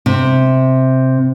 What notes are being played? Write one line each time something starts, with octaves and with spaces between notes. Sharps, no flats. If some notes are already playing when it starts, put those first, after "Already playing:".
C3